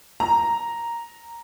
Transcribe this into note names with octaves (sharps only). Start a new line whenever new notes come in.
A#5